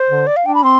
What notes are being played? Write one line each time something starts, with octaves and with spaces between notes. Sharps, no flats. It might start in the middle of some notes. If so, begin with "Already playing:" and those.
Already playing: C5
D3
D5
F5
D4 G5
B5
C4 C6